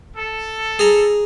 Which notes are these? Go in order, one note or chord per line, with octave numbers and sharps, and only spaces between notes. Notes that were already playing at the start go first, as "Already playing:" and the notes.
A4
G#4 A#5